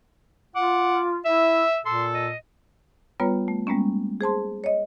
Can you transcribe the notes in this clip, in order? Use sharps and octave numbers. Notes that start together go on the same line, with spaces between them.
F4 F#5 D6
E4 E5 E6
A#2 A4 C6
D#5
G3 B3 F4 B4 C#5 A#5
A3
G3 G#3 A#3 B3 C#4
G#4 C5 A5 C6
C#5 D#5